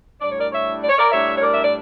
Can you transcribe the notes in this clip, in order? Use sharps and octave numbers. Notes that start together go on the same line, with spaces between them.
A2 G3 D4 D5
C#5
A#4 D5
C#5 E5
D5
C#5
A#4 D5
A2 G3 D4 C#5 E5
C#5
A#4 D5
E5
D5